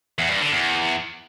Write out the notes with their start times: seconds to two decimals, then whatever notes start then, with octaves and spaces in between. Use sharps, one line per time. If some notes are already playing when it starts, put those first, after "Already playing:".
0.19 E2
0.30 G2
0.41 D3
0.52 E2